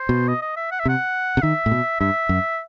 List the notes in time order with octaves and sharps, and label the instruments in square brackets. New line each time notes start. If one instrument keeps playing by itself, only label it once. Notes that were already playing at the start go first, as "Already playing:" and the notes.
Already playing: [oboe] C5
[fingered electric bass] B2
[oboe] D#5
D#5
E5
F#5
E5
[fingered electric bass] C3 [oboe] F#5
[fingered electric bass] C3
[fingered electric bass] D#3 [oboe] E5
[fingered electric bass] A2
B2
[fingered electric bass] G2 [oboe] E5
[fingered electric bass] F#2